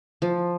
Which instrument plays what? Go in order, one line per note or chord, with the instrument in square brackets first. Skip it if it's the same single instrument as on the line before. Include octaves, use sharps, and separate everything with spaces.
[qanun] F3